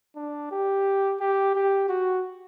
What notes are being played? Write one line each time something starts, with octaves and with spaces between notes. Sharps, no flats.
D4
G4
G4
G4
F#4